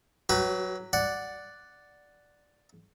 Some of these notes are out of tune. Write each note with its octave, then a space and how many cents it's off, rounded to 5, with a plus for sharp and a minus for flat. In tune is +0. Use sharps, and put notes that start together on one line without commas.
F#3 +0 F#4 +45 B4 +0
D5 +0 F#5 +0